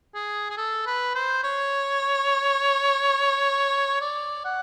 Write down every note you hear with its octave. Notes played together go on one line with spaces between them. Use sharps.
G#4
G#4
A4
B4
C5
C#5
D5
F#5